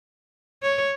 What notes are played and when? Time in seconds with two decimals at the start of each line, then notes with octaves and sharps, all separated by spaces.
0.62 C#5